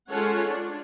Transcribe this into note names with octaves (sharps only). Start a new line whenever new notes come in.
G#3 C#4 F4 A4 C#5 F#5
D4